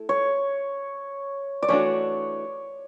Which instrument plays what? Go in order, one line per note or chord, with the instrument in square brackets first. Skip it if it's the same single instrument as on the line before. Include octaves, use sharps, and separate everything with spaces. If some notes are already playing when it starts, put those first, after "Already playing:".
Already playing: [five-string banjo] A3 E4 A4
[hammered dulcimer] C#5
D5
[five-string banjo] E3 A3 D4 F#4 [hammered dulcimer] C#5